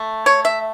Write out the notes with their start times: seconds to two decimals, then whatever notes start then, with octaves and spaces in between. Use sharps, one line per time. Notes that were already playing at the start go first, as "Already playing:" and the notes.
Already playing: A3
0.26 C#5
0.45 E5